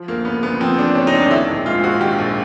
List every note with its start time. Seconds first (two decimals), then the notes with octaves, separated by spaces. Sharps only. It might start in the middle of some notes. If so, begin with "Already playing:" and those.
Already playing: F3
0.08 D2 A#3
0.25 C#3 B3
0.43 D2 B3
0.60 F3 C4
0.78 D2 D4
0.95 C#3 C#4
1.07 D#4
1.13 D2 D4
1.30 D#3 E4
1.48 A#1
1.66 G#2 F4
1.83 A#1 F#4
2.00 D#3 G4
2.19 A#1